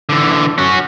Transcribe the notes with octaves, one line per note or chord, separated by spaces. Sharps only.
D3 E3
C#4 F#4